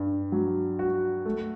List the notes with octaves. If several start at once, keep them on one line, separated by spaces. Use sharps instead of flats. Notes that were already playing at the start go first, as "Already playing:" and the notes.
Already playing: G2
F#3
F#4
A3